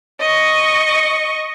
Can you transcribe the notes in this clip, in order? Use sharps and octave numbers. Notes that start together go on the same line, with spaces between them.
D#5 C#6